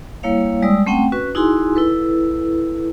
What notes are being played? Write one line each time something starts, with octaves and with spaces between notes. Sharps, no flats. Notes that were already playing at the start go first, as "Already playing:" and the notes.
G3 A#3 E4 C#5 F5
G3 G#3 D5 D#6 E6
A3 C4 C#4 F#5 G5
C#4 F#4 B4
D#4 E4 F#4 G#4 G#5 C6
E4 A4 B4